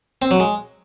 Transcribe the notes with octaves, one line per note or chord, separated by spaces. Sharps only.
C4
F#3
G#3